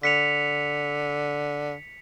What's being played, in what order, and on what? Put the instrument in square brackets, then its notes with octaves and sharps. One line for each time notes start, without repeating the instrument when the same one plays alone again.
[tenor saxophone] D3 [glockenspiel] B6 C#7 F7